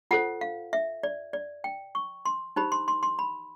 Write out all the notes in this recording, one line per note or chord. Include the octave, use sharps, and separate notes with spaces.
F4 A4 C5 F#5
F5
E5
D5
D5
G5
C#6
C6
D#4 G4 C5 B5
C6
C6
C6
B5